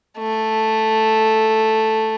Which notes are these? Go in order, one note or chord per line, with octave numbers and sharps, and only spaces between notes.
A3